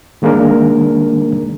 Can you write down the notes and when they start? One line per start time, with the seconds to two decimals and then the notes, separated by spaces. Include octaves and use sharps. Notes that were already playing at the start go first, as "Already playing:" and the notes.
0.22 D#3 G#3 A#3 D4 A#4